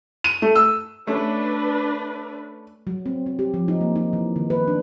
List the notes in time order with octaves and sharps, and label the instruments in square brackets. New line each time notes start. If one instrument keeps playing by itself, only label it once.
[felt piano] D#7
A3
E6
[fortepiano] A3 C#4 [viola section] D4 B4
[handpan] F#3
C4
C4
G4
F3
D#4
A#3
D#4
E3
D#3
B4
D4